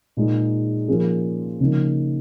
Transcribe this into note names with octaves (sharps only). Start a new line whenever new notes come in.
A#2 G#3 D#4
F3 A#3 C#4 G#4
C#3 F3 A#3 D#4